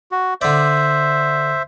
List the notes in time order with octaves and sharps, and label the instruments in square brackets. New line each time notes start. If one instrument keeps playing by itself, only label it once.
[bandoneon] F#4
[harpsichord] D3 D5 [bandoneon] C5 E5